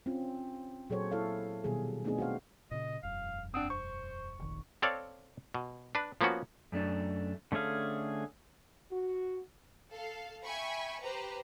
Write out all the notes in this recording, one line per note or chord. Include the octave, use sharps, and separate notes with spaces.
C4 C#4 F4
A#2 F#3 G#4 A4 C5 C#5
E4 A4 C#5 F5
B2 D#3 G3 G#4
A3 B3 C4 D4 D#4 G#4
F#4 C5 F5
A#2 C#3 D#5
E1 F#2 F5
C4 D4 F#5 D#6
C5 C#6
F1 A#1 D#3
C4 A4 C#5 D5 F5
B2
D4 B4
F3 A#3 B3 C#4 F#4
F#2 A3 D4
D3 A3 C#4 G#4 F5
F#4
A4 F5
E5 G5 G#5 B5 C#6
G4 B4 C5 A#5